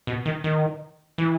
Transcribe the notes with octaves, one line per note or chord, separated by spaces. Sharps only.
B2
D#3
D#3
E3